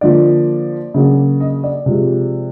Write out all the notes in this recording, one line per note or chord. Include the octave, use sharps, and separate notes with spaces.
D3 F3 A#3 D5
C#3 F#3 A#3
D#5
D5
C3 F3 G#3